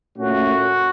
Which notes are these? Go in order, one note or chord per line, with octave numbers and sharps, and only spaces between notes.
A#2 A3 C#4 F#4